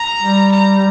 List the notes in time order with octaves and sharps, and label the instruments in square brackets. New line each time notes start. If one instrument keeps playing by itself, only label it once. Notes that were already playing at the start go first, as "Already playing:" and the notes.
Already playing: [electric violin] A#5
[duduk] G3
[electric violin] A#5